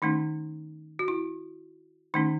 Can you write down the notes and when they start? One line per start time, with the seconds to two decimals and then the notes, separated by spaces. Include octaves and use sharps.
0.02 D#3 A3 C#4 D#4
0.99 F#4
1.08 E4
2.14 D#3 A3 C#4 D#4